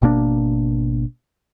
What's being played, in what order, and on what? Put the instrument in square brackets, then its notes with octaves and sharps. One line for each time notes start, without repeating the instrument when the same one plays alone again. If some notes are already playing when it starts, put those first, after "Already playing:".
[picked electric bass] G#1 B2 A#3 D4